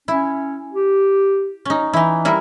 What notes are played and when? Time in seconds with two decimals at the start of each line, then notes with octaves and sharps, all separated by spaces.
0.08 C#4 E4
0.73 G4
1.65 C#4 D#4
1.93 E3 D#4 E4
2.25 G3 E4 A#4